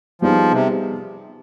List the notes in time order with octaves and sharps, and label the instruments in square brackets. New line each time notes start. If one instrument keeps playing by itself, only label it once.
[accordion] F3 [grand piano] G3 B3 D#4 G#4
[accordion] C3